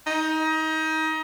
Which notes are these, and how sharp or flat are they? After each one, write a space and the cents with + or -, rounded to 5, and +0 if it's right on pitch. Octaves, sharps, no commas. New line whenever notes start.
D#4 +25